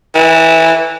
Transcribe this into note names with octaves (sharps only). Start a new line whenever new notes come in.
E3